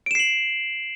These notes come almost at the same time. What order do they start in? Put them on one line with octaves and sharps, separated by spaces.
D7 E7 C7 F#7